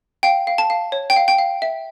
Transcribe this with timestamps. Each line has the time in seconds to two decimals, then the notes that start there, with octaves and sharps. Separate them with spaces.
0.23 F5 G5
0.47 F5
0.58 A5
0.70 F5
0.92 C#5
1.10 G5
1.16 F5
1.28 G5
1.38 F5
1.62 E5